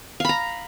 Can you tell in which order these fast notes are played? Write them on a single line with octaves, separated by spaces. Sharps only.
F5 B5 A#5